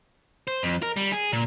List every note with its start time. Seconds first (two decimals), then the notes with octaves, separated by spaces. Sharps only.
0.48 C5
0.63 F2
0.82 A#4
0.97 G3
1.12 G#4
1.33 A#2